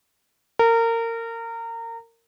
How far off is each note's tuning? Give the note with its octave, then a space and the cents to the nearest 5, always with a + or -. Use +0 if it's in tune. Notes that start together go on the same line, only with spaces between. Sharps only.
A#4 -25